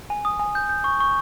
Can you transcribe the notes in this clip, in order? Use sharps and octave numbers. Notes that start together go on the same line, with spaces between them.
G#5
D#6
G#5
G6
G6
C#6
C#6